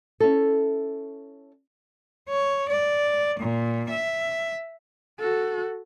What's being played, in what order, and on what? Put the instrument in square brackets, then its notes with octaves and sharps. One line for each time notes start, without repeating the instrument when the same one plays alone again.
[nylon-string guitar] C#4 E4 A4
[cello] C#5
D5
A#2
E5
[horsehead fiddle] F#4 A4